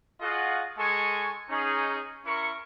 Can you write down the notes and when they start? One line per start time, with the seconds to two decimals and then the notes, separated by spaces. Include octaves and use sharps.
0.21 F4 F#4 G#4 D#5 F5 F#5
0.78 G#3 A4 G#5 C#6
1.49 C#4 D#4 G#4
2.26 C#4 E4 A#4 C#6